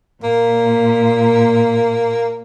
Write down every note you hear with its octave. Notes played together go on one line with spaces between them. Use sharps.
A#2 A#3